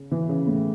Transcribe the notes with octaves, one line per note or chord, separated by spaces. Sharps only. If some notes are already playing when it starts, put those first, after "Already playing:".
Already playing: C#3
E3
C#3
A2